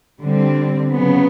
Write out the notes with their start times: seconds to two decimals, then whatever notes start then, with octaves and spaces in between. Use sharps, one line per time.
0.21 D3 G3 C4
0.92 C#3 F#3 B3